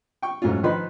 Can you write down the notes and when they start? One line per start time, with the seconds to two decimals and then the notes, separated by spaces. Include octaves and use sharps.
0.22 G5 C#6
0.42 G#2 F#3 A3 C#4 F4
0.63 D#3 F3 D#4 B4 B5 C6